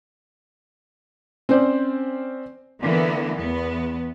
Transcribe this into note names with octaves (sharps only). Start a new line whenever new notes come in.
C4 C#4 C5 D5
D3 E3 A#3 B3
E2 B3